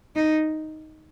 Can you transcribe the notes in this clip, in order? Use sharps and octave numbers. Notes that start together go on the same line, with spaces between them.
D#4